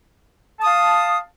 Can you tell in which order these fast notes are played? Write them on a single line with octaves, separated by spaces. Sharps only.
A5 D#6 F5